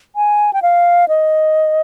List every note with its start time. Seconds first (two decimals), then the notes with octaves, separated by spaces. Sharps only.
0.16 G#5
0.53 G5
0.62 F5
1.08 D#5